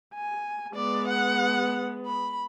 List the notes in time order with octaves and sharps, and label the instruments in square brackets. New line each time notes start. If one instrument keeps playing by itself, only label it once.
[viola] G#5
[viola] G#3 B3 [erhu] D5
[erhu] F#5
B5